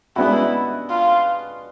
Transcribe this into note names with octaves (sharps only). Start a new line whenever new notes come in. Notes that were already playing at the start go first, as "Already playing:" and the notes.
G#3 B3 D4 E4 F#4
F4